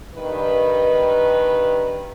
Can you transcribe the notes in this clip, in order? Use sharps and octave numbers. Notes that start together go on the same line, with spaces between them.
G2 D#3 B4